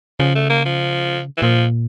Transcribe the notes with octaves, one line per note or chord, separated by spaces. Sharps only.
C#3 F3
A3
A#3
F3
E3
A#2 F3